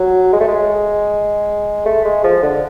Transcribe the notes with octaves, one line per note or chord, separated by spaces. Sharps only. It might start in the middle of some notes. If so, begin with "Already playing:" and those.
Already playing: F#3
G#3
A3
G#3
A3
G#3
F3
D3